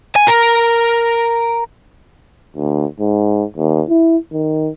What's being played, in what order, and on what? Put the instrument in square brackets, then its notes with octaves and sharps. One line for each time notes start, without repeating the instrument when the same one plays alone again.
[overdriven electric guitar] G#5
A#4
[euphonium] D2
G#2
D#2
E4
D#3